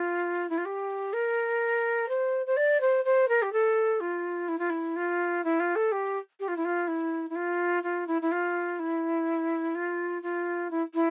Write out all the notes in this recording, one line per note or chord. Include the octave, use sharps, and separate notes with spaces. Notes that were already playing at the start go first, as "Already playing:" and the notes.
Already playing: F4
E4
F4
G4
A#4
C5
C5
D5
C5
C5
A#4
G4
A4
F4
E4
F4
E4
F4
E4
F4
A4
G4
G4
F4
E4
F4
E4
E4
F4
F4
E4
E4
F4
E4
F4
F4
E4
E4